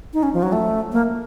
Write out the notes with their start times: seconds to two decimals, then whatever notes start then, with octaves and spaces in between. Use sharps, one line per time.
0.14 D#4
0.23 C#4
0.34 F3
0.43 F#3
0.52 A3
0.92 A#3